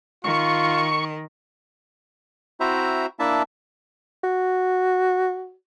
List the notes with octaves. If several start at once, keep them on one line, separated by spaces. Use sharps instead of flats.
D#3 F4 C#6
C4 E4 F#4 C5 E5 A#5
A#3 D4 E4 E5 A5
F#4